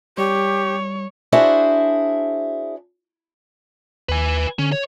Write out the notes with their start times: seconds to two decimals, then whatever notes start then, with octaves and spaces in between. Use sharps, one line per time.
0.18 G3 G4 C#5
1.32 D4 E4 F#4 G#4 C5 E5
4.09 D#2 B4 G#5
4.59 D3 C#4
4.72 C#5